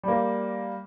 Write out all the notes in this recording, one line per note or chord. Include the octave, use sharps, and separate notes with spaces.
G3 A#3